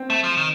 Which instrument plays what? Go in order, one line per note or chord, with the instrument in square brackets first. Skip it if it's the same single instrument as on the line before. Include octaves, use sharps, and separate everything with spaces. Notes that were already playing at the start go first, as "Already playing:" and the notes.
Already playing: [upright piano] C4
[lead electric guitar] A3
F3
D#3